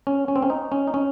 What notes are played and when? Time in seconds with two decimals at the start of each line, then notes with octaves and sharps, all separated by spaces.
0.07 C#4
0.28 C#4
0.36 C4
0.42 C#4
0.50 D#4
0.72 C#4
0.87 D#4
0.94 C#4